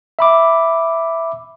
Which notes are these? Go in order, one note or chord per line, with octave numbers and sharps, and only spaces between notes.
E5 B5 D6